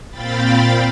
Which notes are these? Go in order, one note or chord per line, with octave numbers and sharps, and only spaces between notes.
A#2 C4 F5 G5 B5 A6